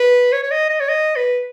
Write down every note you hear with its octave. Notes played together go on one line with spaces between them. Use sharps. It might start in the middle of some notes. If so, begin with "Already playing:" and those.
Already playing: B4
C#5
C#5
D#5
D#5
C#5
D#5
B4